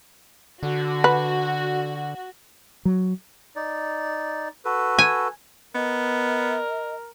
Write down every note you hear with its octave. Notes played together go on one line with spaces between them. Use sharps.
D3 F#4
B4
F#3
D#4 D5
F#4 A4 B4
G#5
B3 A#4 D#5